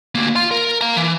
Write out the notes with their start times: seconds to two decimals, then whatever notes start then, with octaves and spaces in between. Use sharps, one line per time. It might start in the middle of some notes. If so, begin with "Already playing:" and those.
0.15 D2 A#3
0.36 F5 C6
0.51 A#4
0.81 F5 A#5
0.97 E3